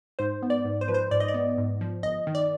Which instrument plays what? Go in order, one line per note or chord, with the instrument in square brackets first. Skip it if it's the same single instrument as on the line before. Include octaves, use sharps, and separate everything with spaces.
[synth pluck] G#2 C5
B3
D5
G#2
C5
F3 B4
C5
G#2 D5
D#5
D5
B3
G#2
F3
G1 D#5
D#3
D5